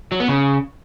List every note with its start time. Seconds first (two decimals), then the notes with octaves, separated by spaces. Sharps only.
0.12 F#3
0.20 B3
0.28 C#3